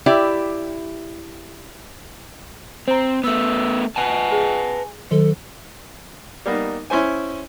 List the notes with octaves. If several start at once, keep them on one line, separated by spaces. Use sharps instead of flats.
E4 G4 D5 E5
C4 C5 A#5
A3 B3 E6
B4 F#5 G#5 A5
G#4
D#3 F#3 A4
G3 A#3 B3 D#4
C#4 E4 C5 G#5